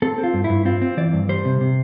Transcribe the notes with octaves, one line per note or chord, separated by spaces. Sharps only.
C4 A4
C4
F4
G2
E4
G2
C4 F4
C4
E3 D5
G2
G3 C5
C3
C3